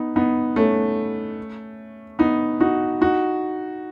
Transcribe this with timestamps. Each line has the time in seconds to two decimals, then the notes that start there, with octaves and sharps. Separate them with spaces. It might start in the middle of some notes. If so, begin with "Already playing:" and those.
Already playing: B3 D#4
0.16 B3 D#4
0.56 A3 C#4
2.19 B3 D#4
2.60 D#4 F#4
3.01 D#4 F#4